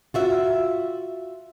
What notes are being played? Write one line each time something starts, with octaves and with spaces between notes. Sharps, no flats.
F4 F#4 E5